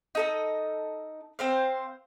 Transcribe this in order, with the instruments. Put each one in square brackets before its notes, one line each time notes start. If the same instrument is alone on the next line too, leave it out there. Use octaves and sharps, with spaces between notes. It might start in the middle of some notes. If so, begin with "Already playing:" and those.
[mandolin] D#4 A4 D#5
C4 C5 F5